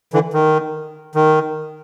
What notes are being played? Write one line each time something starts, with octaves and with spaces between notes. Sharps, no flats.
D3 E3
D#3
D#3